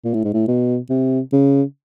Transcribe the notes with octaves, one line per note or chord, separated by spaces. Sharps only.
A#2
A2
G#2
A2
B2
C3
C#3